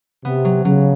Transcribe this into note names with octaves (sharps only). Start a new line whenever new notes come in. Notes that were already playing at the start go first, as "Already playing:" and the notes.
C3 B3
F#3
C#3 F#3